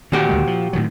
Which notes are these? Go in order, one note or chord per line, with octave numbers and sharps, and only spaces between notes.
A#2 D#3 A#3 F#4 G4
D2 D#3 G#3
F3
A2 D#3 F#3